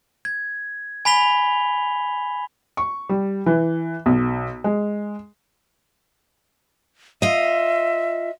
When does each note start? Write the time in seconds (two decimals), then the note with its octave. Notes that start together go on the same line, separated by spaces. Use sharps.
0.25 G#6
1.05 G#5 B5 B6 F7 G7
2.77 C#6
3.09 G3
3.46 E3
4.06 B1
4.64 G#3
7.22 F4 D#5 E5